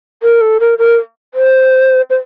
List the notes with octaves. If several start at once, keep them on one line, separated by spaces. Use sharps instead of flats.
A#4
A4
A#4
A#4
C5
C5